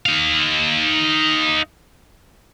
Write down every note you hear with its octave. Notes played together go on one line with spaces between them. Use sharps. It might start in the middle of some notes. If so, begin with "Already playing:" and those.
D#4 F5